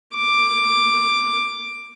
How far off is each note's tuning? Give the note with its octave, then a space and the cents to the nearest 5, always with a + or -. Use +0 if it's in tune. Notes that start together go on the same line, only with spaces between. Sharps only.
D6 +10